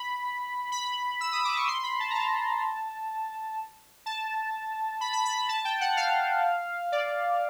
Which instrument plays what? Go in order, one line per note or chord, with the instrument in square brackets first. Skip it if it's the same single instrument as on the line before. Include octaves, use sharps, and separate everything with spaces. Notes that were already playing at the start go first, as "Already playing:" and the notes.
Already playing: [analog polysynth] B5
B5
E6
D#6
D6
C#6
C6
B5
A5
A#5
A5
A5
B5
B5
B5
A5
G5
F#5
F5
D5